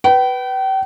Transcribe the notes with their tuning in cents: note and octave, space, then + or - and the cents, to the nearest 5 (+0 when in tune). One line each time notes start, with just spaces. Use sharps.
B4 +0 G5 -35